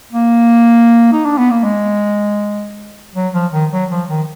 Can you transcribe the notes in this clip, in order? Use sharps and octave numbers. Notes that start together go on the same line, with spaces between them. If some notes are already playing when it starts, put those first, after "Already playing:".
A#3
D#4
D4
B3
A#3
G#3
F#3
F3
D#3
F#3
F3
D#3